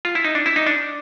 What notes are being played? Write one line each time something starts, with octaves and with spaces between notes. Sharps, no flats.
F4
E4
D#4
D4
E4
D#4
D4